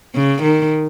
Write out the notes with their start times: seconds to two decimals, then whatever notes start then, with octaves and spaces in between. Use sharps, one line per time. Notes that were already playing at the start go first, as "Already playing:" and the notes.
0.15 C#3
0.43 D#3